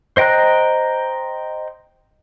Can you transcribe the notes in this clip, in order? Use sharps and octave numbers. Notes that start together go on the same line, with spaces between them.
C5 D#5 G5 A#5 F#6